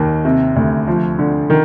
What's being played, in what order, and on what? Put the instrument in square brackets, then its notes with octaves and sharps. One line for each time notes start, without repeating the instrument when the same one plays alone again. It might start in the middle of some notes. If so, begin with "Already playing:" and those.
Already playing: [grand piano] D#2 D#3
C3
D2
F3
D3
D#3